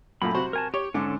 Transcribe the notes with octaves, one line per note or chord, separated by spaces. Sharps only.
F#2 A#2 A3 B5
C3 F#4 C5
A#4 G#5 A5
G4 C#5
G#2 D3 C#4 A4 D6